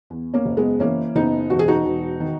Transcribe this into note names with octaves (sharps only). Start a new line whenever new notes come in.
E2
A#3 C#4
F#1
G#3 B3
E3 A#3 C#4
F#1 B3 D#4
E1 F#4
G#4
D#4 F#4
E1
D#3